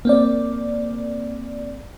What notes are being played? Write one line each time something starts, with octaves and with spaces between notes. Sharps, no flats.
A#3 C4 D5